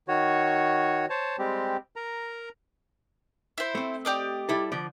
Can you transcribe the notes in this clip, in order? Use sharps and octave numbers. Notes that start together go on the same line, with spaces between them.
D#3 F#4 C#5
C5 C#5 A5
G3 G#3 C4 G4
A#4 A#5
E4 C5
A3 C4
G4 D5 D#5
G3 E4 A4
D3 F3 D5